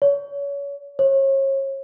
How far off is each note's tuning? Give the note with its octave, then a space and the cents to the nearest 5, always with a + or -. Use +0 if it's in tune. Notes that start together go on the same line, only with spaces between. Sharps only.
C#5 +30
C#5 -35